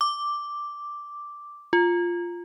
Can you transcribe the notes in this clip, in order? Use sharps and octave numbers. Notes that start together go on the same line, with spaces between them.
D6
F4